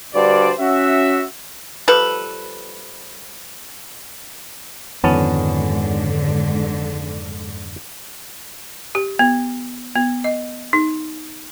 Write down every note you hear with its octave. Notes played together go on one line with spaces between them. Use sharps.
G2 D3 F#4 C5 D5
C#4 F#4 E5
F3 G3 A4 B4
F2 G#2 D3 D#3 F3 B3 C#4 A5
G4
B3
B3
D#5
D#4